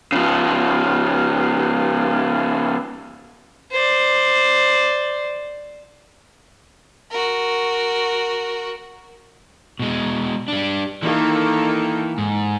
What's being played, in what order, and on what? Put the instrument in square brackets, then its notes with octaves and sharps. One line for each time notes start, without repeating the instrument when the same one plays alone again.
[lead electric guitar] C#3 F3
[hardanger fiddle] C5 D5
[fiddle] F#4 A#4
[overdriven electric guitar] B2 G#3
G3 D4
[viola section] D#3 A#3 A4 [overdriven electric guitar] E3
[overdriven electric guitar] G#2